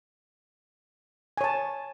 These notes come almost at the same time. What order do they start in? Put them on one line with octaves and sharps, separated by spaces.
G#5 C#5 A5